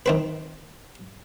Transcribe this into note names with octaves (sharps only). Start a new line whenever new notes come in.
D#3 C4 B4